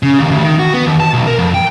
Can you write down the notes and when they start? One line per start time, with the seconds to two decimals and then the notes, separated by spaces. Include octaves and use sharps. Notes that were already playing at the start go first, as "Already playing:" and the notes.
0.03 C#3
0.19 D#2
0.31 D2
0.43 D#3
0.59 F#4
0.74 B3
0.86 D#2
1.00 A5
1.14 B1
1.27 A#4
1.39 F2
1.54 G5